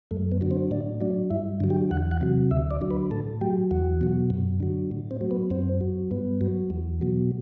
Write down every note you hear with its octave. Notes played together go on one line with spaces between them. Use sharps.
F#2 A3
B3
D3 F#3
C4
A2 D4
F#3 D4
G2 E4
D3 F#3
G4
E2 F#5
F#5
C3 F#3
D2 E5
D5
D3 F#3
B4
A2 A4
F#3 G4
E2 F#4
B2 F#3
F#2
D3 F#3
A2
C4
F#3
B3
F#2 C4
F#3
G2 B3
F#3
E2
B2 F#3